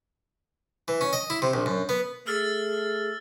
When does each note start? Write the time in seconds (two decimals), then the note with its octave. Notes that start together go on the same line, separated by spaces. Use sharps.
0.88 E3
1.01 C#4
1.13 D#5
1.30 E4
1.42 C3
1.54 A#1
1.66 F#2
1.89 B3
2.27 A3 G#4 E6 F6 A6